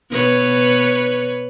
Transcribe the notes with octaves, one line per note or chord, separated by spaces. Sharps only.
B2 B4 C#5